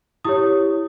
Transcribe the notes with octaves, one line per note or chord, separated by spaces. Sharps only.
E4 G4 C#5 D#6